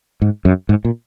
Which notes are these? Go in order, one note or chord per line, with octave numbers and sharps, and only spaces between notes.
G#2
F#2
G#2
A#2